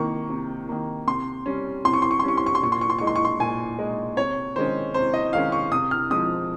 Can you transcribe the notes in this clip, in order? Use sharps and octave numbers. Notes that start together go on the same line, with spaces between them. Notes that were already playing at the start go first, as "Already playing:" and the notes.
Already playing: C3 D#3 A#3 C#6
C3
D#3 A#3
C3 C6
G3 C#4
C3 C6
C#6
C6
C#6
C6
G3 C#4 C#6
C6
C#6
C6
A#2 C#6
C6
C#6
C6
G#3 D#4 C#6
C6
C#6
C6
A#2 G#5
G#3 D#4
C3 C#5
D#3 G#3 C#4 C5
C3 C5
D#5
D#3 G#3 C#4 F5
C#6
C3 D#6
F6
F3 G#3 C4 D#6